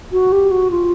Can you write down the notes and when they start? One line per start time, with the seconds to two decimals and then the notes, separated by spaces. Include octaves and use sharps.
0.12 F#4
0.32 G4
0.51 F#4
0.71 F4